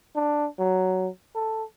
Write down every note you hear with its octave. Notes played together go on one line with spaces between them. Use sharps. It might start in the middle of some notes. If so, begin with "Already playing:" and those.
D4
F#3
A4